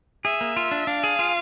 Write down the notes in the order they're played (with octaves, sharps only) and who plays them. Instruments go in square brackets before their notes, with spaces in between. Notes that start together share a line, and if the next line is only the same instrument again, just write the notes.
[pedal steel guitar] G#4 [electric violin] E5
[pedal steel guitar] A#3
F4
D4
[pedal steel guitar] D4 [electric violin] F5
[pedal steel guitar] G#4
F4